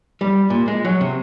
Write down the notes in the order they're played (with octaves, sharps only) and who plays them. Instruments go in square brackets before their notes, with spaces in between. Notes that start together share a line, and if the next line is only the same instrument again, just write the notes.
[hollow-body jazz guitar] G3
A#2
G#3
F#3
C3